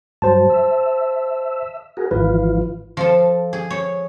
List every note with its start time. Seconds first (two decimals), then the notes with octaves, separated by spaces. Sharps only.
0.22 G2 F#3 C5 A5
0.50 E5
1.97 F#4 G#4 A#4
2.11 G#1 E3 F3 F4 B4
2.97 F3 A4
3.53 G#4
3.70 C#5